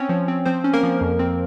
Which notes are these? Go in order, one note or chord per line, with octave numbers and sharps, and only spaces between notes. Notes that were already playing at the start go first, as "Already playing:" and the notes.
Already playing: C4 C#4 C#5
F3
C4
F3 C4 C5
C#4
A#3 A#4
F3
F2
C4